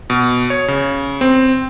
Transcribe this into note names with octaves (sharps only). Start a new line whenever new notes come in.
B2
C#5
C#3
C4